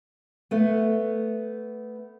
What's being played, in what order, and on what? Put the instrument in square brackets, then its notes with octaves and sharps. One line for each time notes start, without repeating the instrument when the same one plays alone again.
[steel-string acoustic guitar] A3 B3